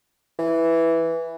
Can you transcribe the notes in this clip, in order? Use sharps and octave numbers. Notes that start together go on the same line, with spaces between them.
E3